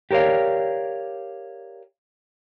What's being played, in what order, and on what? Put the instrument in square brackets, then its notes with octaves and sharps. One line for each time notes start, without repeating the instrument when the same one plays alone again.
[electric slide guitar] G4 A#4 C#5 D5 F5